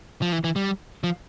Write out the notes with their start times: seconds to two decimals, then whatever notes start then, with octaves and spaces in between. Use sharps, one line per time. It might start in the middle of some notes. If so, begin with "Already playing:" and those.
0.22 F3
0.32 E3
0.44 E3
0.56 G3
1.04 F3